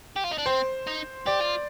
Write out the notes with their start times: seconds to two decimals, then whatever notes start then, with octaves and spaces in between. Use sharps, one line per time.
0.16 G4
0.24 F4
0.31 D#4
0.38 D4
0.46 C4 C5
0.87 D#4
1.26 G4 D5
1.40 F4